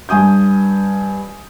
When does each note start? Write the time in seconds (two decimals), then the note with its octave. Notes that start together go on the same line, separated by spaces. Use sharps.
0.09 G2 G#5 D#6 G6